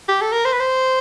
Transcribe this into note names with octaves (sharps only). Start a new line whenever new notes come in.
G4
A4
A#4
C5
B4
C5